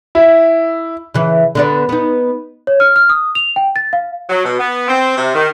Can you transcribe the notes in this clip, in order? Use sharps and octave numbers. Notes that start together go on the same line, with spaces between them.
E4
C#3 E3
D3 B3 D5
B3 D#4
C#5
F6
F6
D#6
F7
G5
A6
F5
F#3
B2
B3
C4
C3
D#3